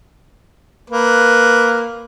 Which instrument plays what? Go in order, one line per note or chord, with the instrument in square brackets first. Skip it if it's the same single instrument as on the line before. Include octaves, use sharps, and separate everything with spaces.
[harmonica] A#3 B4